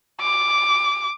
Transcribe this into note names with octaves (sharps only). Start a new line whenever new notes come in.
D6